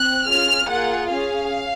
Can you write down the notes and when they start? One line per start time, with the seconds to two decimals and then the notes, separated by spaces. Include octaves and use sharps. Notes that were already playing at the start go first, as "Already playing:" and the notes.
Already playing: C4 F#6
0.26 C#4 F4 G#4 F6
0.68 A#3 F4 G#4 F#5
1.10 C#4 G#4 F5